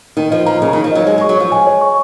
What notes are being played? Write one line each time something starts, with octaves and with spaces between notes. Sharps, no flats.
D#3 D#4
F3 D#5
F3 A#5
C#3 A#4
D#3
D#4
F3
F#3 D#5
G#3 C#5
G#3
C#6
F#3
F3 C#5
G#3 G#5
C#5
C#6